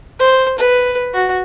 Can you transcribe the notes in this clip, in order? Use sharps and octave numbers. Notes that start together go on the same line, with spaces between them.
C5
B4
F#4